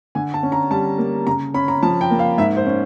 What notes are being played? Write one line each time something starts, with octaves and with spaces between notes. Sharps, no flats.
D3 G#5
A5
C#4
A#5
G3 A5
A#3
C#3 A#5
C#4 B5
A#5
F3 A5
G5
A#3
F5
G#2 E5
C5
C#4